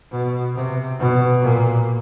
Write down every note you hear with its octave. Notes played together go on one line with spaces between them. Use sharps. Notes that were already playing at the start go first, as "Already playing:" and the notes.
B2
C3
B2
A#2